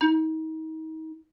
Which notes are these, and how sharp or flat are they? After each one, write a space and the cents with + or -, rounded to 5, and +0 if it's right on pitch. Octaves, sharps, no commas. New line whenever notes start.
D#4 +35